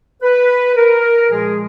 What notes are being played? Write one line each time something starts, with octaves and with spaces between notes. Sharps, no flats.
B4
A#4
A#2 F3 G#3 G#4